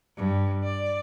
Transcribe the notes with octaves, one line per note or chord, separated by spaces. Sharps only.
G2
D5